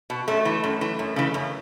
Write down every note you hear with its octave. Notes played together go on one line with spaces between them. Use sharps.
B2
F#2 A3
E3
F#2
E3
F#2
C#3 E3
F#2